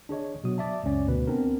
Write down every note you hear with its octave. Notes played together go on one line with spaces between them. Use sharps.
D4 G#4 C#5 D#5
B2 F#3 D#6
D5 E5 A5
C#2 F#2 C#4 D5
D2 B2 B4
B3 C4 D4 A#4